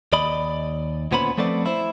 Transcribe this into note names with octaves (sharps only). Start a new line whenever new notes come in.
D#2 D5 D#5 B5
D2 A#2 B3 C#4 C5 B5
F3 A3 B3 C4 D5
E4 C5